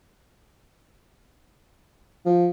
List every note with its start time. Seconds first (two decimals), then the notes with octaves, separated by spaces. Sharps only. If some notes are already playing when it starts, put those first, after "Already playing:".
2.25 F3